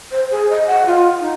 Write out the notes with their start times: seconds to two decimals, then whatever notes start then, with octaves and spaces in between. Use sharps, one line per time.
0.11 C5
0.31 G#4
0.50 D#5
0.67 F#5
0.86 F4
1.21 D#4